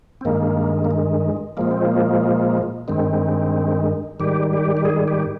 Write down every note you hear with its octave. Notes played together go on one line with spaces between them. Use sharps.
C4
G2 D#3 G#3 A#3
A#3
G#3
A#2 F3 G#3 A#3
C4
A#3
G2 D#3 G#3 C4
G#2 D#3 G3 G4
G4
G4
G#4
G4